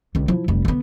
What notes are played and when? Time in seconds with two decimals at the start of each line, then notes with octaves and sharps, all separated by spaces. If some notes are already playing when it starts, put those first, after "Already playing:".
0.15 C#2 D3
0.28 F3 E4
0.48 F1 G3
0.65 D3 B3